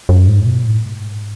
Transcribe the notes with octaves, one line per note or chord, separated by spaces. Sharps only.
F#2
G#2
B2
A2
G#2